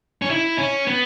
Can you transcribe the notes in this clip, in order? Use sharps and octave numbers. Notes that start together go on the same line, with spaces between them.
C#4
E4
C#4
B3